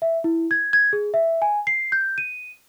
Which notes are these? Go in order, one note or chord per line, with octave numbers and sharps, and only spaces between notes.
E5
E4
G#6
G#6
G#4
E5
G#5
C7
G6
D#7